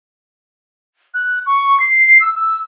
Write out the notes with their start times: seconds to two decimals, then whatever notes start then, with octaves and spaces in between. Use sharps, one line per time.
1.14 F#6
1.46 C#6
1.80 C7
2.20 E6
2.35 E6